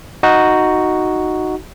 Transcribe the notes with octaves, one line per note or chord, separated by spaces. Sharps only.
D#4 F#4